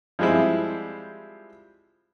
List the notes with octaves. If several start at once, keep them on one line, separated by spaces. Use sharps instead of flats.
F3 G3 G#3 C4 E4